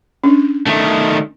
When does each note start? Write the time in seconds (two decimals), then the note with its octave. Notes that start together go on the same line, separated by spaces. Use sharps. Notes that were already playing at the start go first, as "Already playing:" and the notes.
0.24 C#4 D4
0.66 D#3 A3